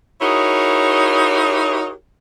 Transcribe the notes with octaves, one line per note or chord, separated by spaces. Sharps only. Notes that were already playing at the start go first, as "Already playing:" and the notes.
D#4 E4 F#4 G#4 A#4 C#5